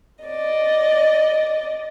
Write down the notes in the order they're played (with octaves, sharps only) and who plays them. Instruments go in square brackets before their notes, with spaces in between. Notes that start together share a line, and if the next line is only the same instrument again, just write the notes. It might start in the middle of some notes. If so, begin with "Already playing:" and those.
[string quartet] D5 D#5